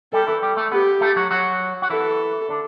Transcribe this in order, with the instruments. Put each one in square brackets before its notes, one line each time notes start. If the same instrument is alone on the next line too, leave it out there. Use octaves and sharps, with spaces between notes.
[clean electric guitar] G3 G4 [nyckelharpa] A4
[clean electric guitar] E3 E4
G3 G4
A3 A4
[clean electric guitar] B3 B4 [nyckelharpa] G4
[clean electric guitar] A3 A4
F#3 F#4
F#3 F#4
F#4
[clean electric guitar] E3 E4 [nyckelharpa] A4
[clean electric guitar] D3 D4